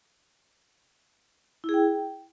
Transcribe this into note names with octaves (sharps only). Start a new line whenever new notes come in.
E4
G#4
G5